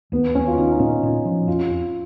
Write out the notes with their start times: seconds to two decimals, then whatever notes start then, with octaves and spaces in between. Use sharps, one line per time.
0.12 D#2 B3
0.35 D#2 C#4
0.47 F4
0.57 D#3 D#4
0.71 D#4
0.79 A#2 C#4
1.03 A#2
1.25 F3
1.48 F2 F4
1.70 F2